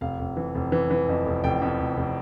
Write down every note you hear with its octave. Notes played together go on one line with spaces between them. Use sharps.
F1 F5
F1
E3
F1
E3
E3
F2
F1
F1 G5
F2
F1
F1